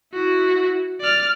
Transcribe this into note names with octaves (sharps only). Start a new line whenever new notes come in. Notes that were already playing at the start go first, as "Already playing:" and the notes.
E4 F#4
D5 F6